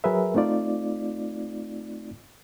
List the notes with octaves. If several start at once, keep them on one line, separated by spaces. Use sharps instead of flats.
F#3 G#4 A#4 B4 E5
A3 C4 D#4 F4 D5